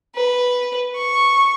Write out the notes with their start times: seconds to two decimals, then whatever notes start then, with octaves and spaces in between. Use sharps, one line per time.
0.15 B4
0.95 C#6